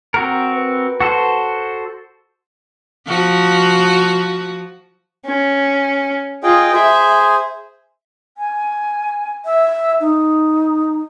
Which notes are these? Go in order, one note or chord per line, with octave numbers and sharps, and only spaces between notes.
C4 F#4 A#4
B4
F#4 A4 C5
F3 F#4
C#4
F4 G#4 D#5 G5
G#4 C5 E5
G#5
E5
D#4